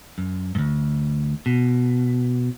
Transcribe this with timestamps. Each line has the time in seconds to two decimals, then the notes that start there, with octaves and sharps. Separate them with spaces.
0.18 F#2
0.55 D2 G2
1.46 B2